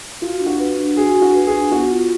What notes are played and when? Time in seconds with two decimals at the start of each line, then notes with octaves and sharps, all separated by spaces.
0.21 F4 F#4
0.40 D4
0.46 F#4
0.59 B4
0.78 D4
0.97 F#4 G#4
1.15 D4
1.22 F#4
1.35 B4
1.47 G#4
1.53 D4
1.72 B3 F#4
1.90 F4